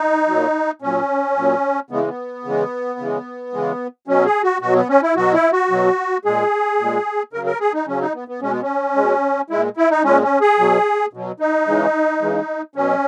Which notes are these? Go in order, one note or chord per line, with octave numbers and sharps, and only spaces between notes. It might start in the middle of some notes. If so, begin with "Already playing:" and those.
Already playing: D#4
A#2 F#3
A#2 F#3 C#4
A#2 F#3
C#3 E3 G#3 B3
B3
C#3 E3 G#3
C#3 E3 G#3
C#3 E3 G#3
B2 F#3 C#4
G#4
F#4
B2 F#3 F#4
B3
C#4
E4
B2 F#3 F#4
E4
F#4
B2 F#3
A#2 G#3 G#4
A#2 G#3
C#3 F#3 A#4
A#4
G#4
D#4
C#3 F#3 C#4
D#4
B3
B3
B2 G#3 C#4
B3
C#4
B2 G#3
A#2 G#3 E4
E4
D#4
A#2 G#3 C#4
C#4
G#4
B2 F#3
B2 F#3
D#4
C#3 E3 G#3
C#3 E3 G#3
B2 F#3 C#4